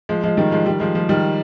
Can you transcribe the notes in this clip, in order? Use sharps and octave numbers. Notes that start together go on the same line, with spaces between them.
F3 G#3
F3 G#3
D#3 G3
F3 G#3
D#3 G3
F3 G#3
F3 G#3
D#3 G3